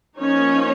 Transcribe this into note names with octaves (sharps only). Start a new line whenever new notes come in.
F3 A#3 C#4 D#4 C#5